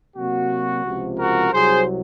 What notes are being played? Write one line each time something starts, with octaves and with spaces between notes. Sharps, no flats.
C3 F#3 A#3 F#4
C#2 C3 F3
F#4 A#4
C2 C3 F#3 G#4 C5